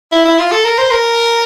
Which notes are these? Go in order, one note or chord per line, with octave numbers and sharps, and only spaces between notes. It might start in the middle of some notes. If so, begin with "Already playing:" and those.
E4
E4
F4
A4
A#4
C5
A#4